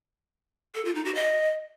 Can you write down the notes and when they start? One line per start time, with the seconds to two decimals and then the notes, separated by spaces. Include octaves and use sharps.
0.75 A4
0.85 F4
0.95 D#4
1.05 F#4
1.15 D#5